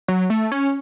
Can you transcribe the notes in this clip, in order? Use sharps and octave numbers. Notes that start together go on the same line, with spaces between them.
F#3
A3
C#4